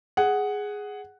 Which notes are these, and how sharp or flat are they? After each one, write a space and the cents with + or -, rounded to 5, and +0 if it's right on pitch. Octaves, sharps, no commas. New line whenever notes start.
G#4 +0 F#5 +5